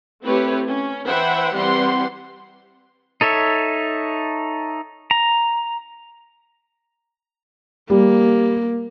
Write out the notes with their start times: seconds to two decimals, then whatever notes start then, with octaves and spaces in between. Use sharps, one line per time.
0.23 A3 C4 E4 G4 B4 C#5
0.67 C#4
1.07 E3 C5 E5 F#5 G5 B5
1.55 E3 G3 C4 G4 F#5 C6
3.21 D#4 A4 C#5 E5
5.11 A#5
7.90 G3 A#3